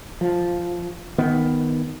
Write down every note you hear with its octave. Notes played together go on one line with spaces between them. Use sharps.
F3
D#3 B3